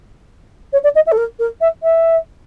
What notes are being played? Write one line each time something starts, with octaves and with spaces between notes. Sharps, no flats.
C#5
D5
D#5
E5
A4
A#4
A#4
E5
E5